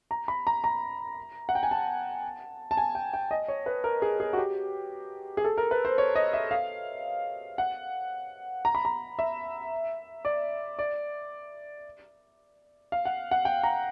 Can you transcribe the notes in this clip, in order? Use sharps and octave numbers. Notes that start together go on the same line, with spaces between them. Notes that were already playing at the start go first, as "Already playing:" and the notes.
A#5
B5
A#5
A#5
F#5
G5
G#5
A5
A5
G#5
G5
G5
D#5
C#5
B4
A#4
G#4
G#4
F#4
G4
G#4
A4
A#4
B4
C5
C#5
D#5
E5
F5
F#5
A#5
B5
A#5
E5
D5
D5
F5
F#5
F#5
G5
A#5